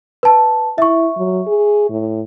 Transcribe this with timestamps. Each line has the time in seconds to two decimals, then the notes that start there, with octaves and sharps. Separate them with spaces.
0.23 B4 A5
0.78 E4 E5 C#6
1.17 F#3
1.47 G#4
1.90 A2